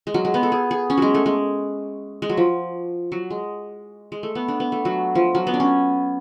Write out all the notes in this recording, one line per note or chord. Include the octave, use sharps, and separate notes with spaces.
G#3
F#3
G#3
B3
A4
G#4
G#4
C#4
F#3 G#3
A3
G#3
G#3
F#3
F3
F#3
G#3
G#3
A3
B3
D4
B3
A3
F#3
F3
F#3
B3
D4
C#4